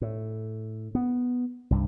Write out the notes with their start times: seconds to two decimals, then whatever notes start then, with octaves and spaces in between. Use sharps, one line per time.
0.01 A2
0.95 B3
1.70 C2 G2